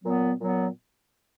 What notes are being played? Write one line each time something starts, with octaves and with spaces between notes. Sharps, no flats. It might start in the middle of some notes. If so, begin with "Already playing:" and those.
A#2 F#3 B3
A#2 F#3 B3